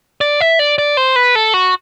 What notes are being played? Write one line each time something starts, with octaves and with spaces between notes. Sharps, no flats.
D5
E5
D5
D5
C5
B4
A4
F#4